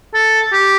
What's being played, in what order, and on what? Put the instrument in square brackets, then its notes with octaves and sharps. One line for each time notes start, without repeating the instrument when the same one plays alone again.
[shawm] A4
G4